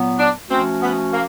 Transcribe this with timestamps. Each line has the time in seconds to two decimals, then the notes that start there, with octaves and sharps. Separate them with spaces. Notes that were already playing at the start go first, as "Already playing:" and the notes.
Already playing: A#2 F#3 B3
0.18 D4
0.49 F3 A3 C4 C#4 F#4
0.81 B3
1.12 A#3